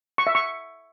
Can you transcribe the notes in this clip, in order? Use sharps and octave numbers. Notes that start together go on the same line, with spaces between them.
C#6
E5
C#6